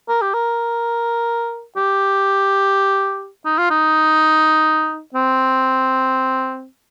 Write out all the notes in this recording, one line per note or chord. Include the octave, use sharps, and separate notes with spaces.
A#4
G4
A#4
G4
D#4
F4
D#4
C4